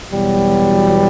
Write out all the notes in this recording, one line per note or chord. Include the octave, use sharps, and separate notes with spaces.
E2 B2 F#3 G3